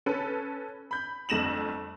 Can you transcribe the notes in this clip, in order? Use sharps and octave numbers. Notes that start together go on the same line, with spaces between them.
C#4 A4 B4
B5 G6
G1 F2 A3 A#6 E7 F#7